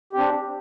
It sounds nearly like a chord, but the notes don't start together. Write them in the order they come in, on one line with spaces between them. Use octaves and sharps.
G4 C4 D4